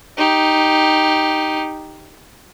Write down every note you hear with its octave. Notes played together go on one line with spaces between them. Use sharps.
D#4 G4